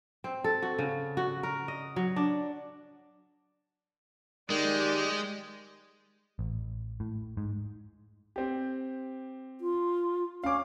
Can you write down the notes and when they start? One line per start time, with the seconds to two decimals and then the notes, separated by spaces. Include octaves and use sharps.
0.24 C4
0.44 A4
0.62 F#4
0.79 C#3
1.17 F#4
1.43 A#4
1.68 D#5
1.96 F#3
2.16 D4
4.50 D#3 G#3 G4 D5
6.39 A1
7.00 A2
7.37 G#2
8.36 C4 G4
9.61 F4
10.44 C#4 F5 D6